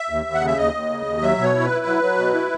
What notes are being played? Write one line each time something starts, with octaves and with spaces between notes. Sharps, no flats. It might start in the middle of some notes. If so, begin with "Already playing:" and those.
Already playing: E5
D#2
D#2
F#5
C#3
E5
D#2 D#5
D#2
C#3
D#2
F#3 E5
B2
C#5
E4
B4
E4
F#3
F#3
B2
E4